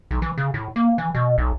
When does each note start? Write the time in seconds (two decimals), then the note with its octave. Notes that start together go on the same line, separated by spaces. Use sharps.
0.11 B1
0.22 E3
0.38 C#3
0.54 A2
0.76 A#3
0.98 E3
1.15 B2
1.38 B1